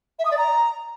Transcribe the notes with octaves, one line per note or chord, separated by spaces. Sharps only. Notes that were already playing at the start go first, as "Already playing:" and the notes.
E5
D#6
D5
A#5